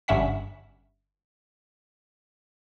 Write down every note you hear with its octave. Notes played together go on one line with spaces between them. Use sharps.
G1 G2 C#4 E5 F#5 B6